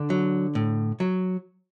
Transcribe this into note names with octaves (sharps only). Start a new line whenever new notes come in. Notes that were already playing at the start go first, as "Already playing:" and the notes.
Already playing: D3 D4
F#3
A2
F#3